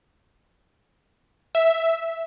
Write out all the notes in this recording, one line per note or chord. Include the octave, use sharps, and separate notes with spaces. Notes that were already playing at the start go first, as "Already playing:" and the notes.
E5